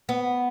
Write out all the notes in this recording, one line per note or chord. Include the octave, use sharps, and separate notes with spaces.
B3